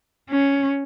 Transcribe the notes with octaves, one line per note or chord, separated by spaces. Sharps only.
C#4